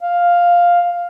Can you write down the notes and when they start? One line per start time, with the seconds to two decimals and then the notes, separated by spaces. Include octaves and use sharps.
0.01 F5